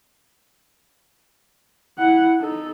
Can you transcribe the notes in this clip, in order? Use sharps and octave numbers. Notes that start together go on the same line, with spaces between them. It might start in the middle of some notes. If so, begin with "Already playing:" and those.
E4 F#5
D#4 A4